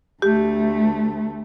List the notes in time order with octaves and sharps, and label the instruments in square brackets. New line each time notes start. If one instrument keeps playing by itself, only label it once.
[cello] D2 A3 [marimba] G4